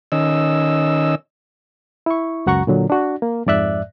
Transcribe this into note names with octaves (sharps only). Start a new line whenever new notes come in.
D#3 C#4 D#5 E6
E4 C#6
C#2 F#2 F#4 F#5 A#5 C#6
A#2 D3 F#3
D4 F#4
A#3
F2 G#2 D5 E5 F#6